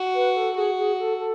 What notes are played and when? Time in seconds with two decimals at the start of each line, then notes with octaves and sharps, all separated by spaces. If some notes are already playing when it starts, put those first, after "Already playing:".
Already playing: F#4
0.14 B4
0.34 A4
0.55 F#4 G#4
0.77 G#4
0.98 A4
1.18 A4